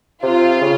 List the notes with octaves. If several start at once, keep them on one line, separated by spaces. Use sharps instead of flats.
C3 F4
C#3